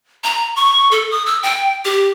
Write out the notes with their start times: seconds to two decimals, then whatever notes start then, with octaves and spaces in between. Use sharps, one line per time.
0.24 A#5
0.56 C#6
0.91 A4
1.11 D#6
1.26 E6
1.43 G5
1.85 G4